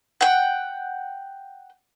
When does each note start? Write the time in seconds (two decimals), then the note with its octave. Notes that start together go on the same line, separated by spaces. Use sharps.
0.21 F#5 G5